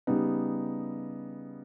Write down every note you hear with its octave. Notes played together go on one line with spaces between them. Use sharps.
C#3 G3 B3 D#4